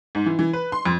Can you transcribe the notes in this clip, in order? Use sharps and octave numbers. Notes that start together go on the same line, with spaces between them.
G#2
E3
E3
B4
C6
F2